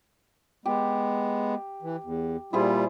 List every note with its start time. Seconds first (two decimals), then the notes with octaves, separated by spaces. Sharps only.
0.66 G#3 B3 G4
1.82 E3
2.04 E2
2.53 A#2 G3 E4 F4 G#4 C5